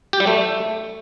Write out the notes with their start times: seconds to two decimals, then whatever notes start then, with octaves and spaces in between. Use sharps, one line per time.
0.13 G4
0.20 G3
0.27 A3